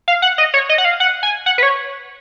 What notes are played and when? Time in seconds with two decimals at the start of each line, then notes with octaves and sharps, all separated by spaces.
0.08 F5
0.22 F#5
0.38 D#5
0.54 C#5
0.69 D#5
0.78 F#5
0.85 F5
1.00 F#5
1.23 G#5
1.46 F#5
1.58 B4
1.63 C#5